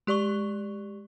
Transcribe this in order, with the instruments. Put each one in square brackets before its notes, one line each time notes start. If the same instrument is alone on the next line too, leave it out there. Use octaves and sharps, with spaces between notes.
[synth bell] G#3 G4 D5 C#6 G7